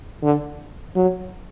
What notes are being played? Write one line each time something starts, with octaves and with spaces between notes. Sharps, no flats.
D3
F#3